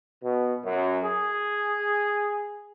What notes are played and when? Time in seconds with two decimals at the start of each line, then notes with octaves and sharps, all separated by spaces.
0.22 B2
0.64 F#2
1.03 G#4